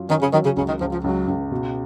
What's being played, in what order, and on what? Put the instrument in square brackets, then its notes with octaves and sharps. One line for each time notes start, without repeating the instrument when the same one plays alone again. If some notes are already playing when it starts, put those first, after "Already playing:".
Already playing: [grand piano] F#2 F#3 F4
[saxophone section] D#3 [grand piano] C#4
[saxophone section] C#3
[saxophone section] D#3 [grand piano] F#3
[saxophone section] C#3
[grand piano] C#2 [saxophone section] C#3
[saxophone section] D#3
[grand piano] C#2 [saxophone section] F3
[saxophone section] F3
[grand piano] C#2 [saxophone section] F#3
[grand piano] C#2
B2